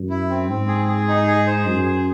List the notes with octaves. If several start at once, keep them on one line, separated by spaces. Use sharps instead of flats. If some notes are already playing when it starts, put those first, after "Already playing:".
Already playing: F#2
E4
C4
G#2 C4
G#4
G#4
D#4
G#4
C5
F#2 G#4
G#4